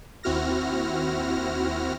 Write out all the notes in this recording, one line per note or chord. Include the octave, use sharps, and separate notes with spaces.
D#2 C4 E4 F#4 F6 A#6